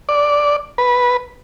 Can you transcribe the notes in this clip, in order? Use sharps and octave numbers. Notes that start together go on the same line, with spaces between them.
D5
B4